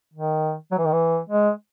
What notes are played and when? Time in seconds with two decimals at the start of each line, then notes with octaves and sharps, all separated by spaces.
0.14 D#3
0.72 F#3
0.78 E3
0.85 D#3
0.92 E3
1.30 G#3